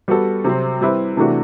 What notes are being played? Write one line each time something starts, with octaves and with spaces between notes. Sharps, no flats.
G3 B3 F#4 A4
C3 F#3 C4
G3 C4 E4 G4 B4
C3 E3 A3 D4 F#4